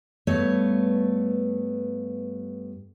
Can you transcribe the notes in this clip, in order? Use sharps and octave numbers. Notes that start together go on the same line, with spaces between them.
G2 A3 B3 C#5